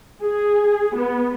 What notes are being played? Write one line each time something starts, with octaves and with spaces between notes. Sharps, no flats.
G#4
B3